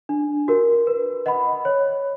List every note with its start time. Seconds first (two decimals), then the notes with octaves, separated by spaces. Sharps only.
0.09 D4
0.48 F#4 A#4
0.87 B4
1.26 D#5 F#5 B5
1.65 C#5